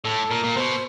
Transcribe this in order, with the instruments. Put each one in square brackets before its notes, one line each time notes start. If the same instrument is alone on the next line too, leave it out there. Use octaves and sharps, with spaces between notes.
[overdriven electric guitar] A2 [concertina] A4
[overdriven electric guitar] A#2 [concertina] A#4
[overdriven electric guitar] A#2
[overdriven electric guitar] B2 [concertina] C5